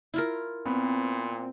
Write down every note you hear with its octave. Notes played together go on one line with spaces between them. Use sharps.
E4 F4 A#4
A#2 B3 C4